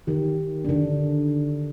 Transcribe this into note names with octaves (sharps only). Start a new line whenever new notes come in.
D#3 G4
D3 D4